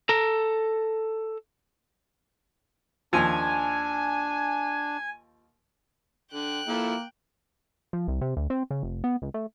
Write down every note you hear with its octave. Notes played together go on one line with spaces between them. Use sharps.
A4 A#5
D#2 F3 D4 G#5
D3 G5 F#6
F3 A#3 E4 A4
F3
C2
C3
D2
C4
C#3
F1
B3
C#2
A3